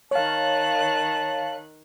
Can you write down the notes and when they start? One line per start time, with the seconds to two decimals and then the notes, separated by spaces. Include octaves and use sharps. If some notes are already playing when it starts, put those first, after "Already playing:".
0.11 D#3 C#5 F5 A5 F#6